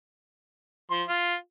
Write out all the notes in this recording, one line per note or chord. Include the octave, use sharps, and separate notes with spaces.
F3 C6
F4